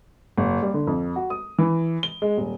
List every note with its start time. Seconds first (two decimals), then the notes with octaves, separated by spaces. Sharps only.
0.38 F#1
0.63 G3
0.74 D3
0.87 F2
1.16 F#4
1.30 D#6
1.59 E3
2.03 G7
2.22 G#3
2.37 D#1